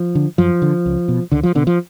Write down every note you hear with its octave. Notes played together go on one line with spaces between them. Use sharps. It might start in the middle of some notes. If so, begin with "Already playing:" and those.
Already playing: F3
D3
F#2 F3
D3
C#2
B2
C#2 D3
F3
B2 D3
F3